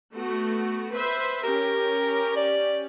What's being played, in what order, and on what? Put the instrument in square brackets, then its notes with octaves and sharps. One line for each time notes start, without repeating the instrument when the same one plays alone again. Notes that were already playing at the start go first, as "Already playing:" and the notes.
[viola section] A3 B3 F#4
B4 C5 E5
[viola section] C#4 G4 [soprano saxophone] A#4
[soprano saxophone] D5